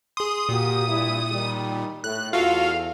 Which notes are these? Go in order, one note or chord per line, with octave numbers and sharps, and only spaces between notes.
G#4 C6 D#6
A#2 A#3 F#4 G4
G2 E4
D#3 G3
A2 F#6
E2 F4 F#4 A4 F5